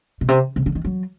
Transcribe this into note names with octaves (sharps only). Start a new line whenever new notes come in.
B2
C3
C3
D3
D#3
F#3